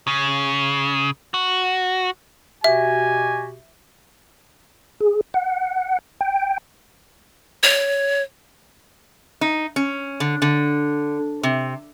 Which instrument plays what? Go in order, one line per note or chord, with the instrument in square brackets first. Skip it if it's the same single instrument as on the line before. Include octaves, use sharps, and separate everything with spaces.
[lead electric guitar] C#3
F#4
[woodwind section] B2 F#4 G4 [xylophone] E5 [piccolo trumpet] G#5
[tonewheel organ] G#4
F#5
G5
[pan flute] C#5
[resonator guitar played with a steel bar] D#4
C#4
D3
D3
C3